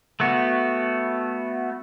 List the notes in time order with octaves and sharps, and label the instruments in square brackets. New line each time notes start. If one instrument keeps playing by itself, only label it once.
[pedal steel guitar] A3 B3 F#4